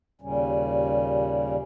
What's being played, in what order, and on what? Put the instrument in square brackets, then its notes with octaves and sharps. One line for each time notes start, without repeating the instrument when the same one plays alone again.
[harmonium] D#2 A#2 C#3 G3 C#4